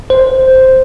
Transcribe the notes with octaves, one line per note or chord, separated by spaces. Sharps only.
C5